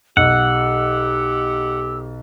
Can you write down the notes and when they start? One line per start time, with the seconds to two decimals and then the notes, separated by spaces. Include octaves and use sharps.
0.17 B1 G4 F#5 E6